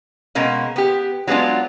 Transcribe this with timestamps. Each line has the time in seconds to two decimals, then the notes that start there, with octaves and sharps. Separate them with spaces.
0.35 B2 G#3 A#3 C#4
0.76 B3 G4
1.28 F#3 G#3 B3 D4 F4